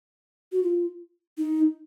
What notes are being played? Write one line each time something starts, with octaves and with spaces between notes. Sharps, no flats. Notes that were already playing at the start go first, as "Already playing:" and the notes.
F#4
F4
D#4